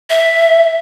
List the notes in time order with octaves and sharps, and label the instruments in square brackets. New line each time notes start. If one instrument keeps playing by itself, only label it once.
[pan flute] E5